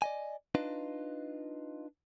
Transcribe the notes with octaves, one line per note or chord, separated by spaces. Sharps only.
D5 D#5 G#5
D4 D#4 F4 B4 D#5